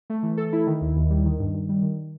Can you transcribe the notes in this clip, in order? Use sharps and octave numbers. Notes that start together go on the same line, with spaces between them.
A3
E3
A4
E4
D#3
D#2
D#2
G3
D#3
G2
G2
G3
D#3